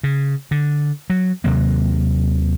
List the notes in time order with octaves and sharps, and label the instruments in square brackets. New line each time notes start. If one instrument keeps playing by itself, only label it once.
[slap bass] C#3
D3
F#3
D#2 C3 F#3 A#3